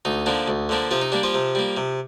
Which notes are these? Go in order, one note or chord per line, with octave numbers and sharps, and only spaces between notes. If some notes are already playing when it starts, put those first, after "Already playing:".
D2 D#4
D3 F3 A#3 D4
D2
D3 F3 A#3 D4
C3 F3 F4
D#4
G3 A#3 D4
F3 F4
C3
G3 A#3
C3